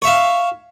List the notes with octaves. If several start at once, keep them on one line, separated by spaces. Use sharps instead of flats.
C#5 E5 F5